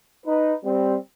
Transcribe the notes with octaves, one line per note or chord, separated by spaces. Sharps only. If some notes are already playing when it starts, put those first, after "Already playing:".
D#4 B4
G3 C4